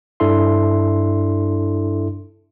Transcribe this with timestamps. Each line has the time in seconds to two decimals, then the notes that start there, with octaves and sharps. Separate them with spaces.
0.20 G2 D4 E4 A4 E5 C6